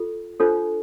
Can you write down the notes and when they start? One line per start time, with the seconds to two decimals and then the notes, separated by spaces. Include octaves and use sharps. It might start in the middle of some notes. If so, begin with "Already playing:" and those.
Already playing: F4 A4
0.40 D4 F4 A4 C5